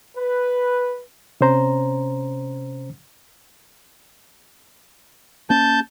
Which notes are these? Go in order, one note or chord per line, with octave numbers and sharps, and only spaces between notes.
B4
C3 C#4 C5 A#5
A#3 C#4 A5 G6